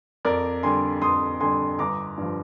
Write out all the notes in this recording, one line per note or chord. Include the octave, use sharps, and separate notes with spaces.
F2 A#4 D5
D3 G3 G#5 C6
F2 C6 D#6
D3 G3 G#5 C6
G1 A#5 D6
G2 F3